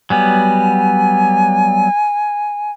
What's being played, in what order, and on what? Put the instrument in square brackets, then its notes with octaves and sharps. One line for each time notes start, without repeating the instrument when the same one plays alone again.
[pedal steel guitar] F#3 G3 B3 [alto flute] G#5